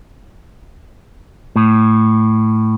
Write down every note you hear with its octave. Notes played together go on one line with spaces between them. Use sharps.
A2